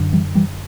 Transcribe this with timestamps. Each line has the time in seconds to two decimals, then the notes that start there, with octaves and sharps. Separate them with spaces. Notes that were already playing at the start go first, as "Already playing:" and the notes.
Already playing: F#2 D3
0.13 E3 G3
0.35 E3 G3